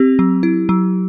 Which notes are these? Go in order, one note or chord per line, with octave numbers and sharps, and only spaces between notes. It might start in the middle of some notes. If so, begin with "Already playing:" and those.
Already playing: C4 G4
F#3
E4
F#3